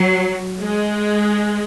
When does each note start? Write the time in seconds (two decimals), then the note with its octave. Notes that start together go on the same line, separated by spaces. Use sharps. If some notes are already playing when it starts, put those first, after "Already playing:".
Already playing: F#3
0.60 G#3